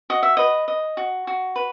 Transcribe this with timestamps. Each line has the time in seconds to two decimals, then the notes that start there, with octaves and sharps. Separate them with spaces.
0.10 F#4 D#5
0.23 E5
0.37 B4 D#5
0.68 D#5
0.97 F#4
1.27 F#4
1.56 B4